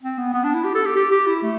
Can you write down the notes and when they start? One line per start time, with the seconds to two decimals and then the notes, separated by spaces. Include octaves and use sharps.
0.03 C4
0.18 B3
0.33 B3
0.44 D4
0.54 E4
0.64 G4
0.75 A4
0.85 G4
0.96 G4
1.11 G4
1.27 E4
1.42 A3